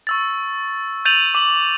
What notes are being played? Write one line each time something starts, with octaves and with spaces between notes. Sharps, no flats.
C#6 E6 A6
G6 A6 D#7 F7 F#7
D6 F#7